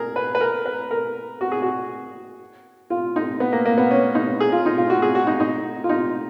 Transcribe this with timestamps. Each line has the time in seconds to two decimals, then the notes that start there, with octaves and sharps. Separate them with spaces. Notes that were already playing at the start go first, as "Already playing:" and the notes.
Already playing: G#4 A#4
0.16 B4
0.35 B4
0.41 A#4
0.66 B4
0.91 A#4
1.41 F#4
1.52 G#4
1.62 F#4
2.90 F4
3.16 D#4
3.40 B3
3.53 A#3
3.65 A#3
3.78 B3
3.91 C#4
4.15 D#4
4.40 G#4
4.52 F4
4.66 D#4
4.77 F4
4.90 F#4
5.02 G#4
5.15 F#4
5.27 D#4
5.40 D#4
5.84 F4
5.89 D#4